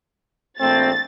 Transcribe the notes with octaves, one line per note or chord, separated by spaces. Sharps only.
A#1 A3 C4 A6